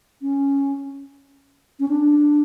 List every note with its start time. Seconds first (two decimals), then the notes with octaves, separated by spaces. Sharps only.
0.22 C#4
1.80 C#4
1.88 D4